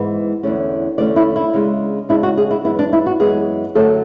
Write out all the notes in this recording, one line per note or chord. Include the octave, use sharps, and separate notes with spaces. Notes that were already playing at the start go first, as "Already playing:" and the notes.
Already playing: G#2 E3 G#3 B3
E2 D3 A3 C#4
E2 D3 A3 C#4 D5
E4
E4
C#3 G#3 D4
C#3 G#3 D4 E4
F#4
G#4
E4
F#2 E3 G#3 B3 E4
D4
E4
F#4
F#2 E3 G#3 B3 G#4
F#2 D3 F#3 A3 A4